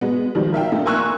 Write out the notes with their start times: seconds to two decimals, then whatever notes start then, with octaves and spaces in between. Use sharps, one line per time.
0.01 G#3 B3
0.35 D#3 F3 G3 G#3
0.52 A#4 E5 F5 G5
0.72 A3 D4 D#4 F4
0.86 A#4 G#5 C6 C#6 E6 F#6